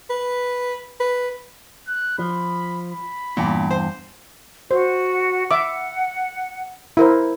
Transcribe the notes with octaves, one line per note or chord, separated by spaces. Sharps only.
B4
B4
F#6
F3 B5
B5
E2 G2 A#2
C5
F#4 C5
E5 F#5 D6
E4 A#4 C5